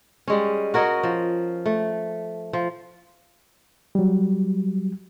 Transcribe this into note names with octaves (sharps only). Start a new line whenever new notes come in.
G3 G#3 C#4
F#4 A#4 C#5 D#5
F3
A3
F3
F#3 G3